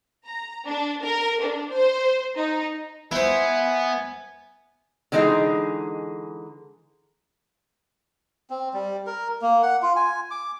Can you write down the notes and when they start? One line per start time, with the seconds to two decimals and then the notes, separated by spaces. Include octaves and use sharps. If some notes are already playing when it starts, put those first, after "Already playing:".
0.25 A#5
0.67 D4
1.02 A#4
1.40 D4
1.71 C5
2.36 D#4
3.12 B3 E4 C5 E5 G#5
5.12 D3 E3 G#3 D#4 G#4
8.50 C4
8.74 G3
9.07 A#4
9.42 A#3
9.63 F#5
9.82 F4
9.96 G#5
10.31 D6